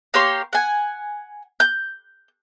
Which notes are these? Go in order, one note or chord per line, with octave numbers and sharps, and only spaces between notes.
A#3 G4 C#5 C6
F#5 G#5
G6